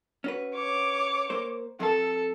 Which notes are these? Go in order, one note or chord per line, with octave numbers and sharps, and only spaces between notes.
C#4 F#4 B4
C#5 D6
A#3 C5
F2 A4